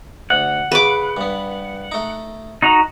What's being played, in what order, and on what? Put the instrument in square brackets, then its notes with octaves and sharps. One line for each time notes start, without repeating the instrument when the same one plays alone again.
[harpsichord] D2 [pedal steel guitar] F#5
[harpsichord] C#3 [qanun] B4 D6
[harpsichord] G2 B3
A3 D#4
[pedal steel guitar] D#4 F#4 A#5